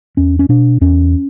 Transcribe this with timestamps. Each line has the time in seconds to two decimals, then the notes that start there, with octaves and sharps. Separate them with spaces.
0.17 E2 C#4
0.39 C#4
0.49 B2 D4
0.81 E2 C#4